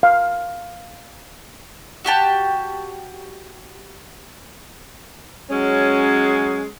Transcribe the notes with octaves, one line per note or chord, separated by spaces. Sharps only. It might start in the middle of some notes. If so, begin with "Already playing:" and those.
F5
F#4 G4 G5 A5
F#3 G#3 C#4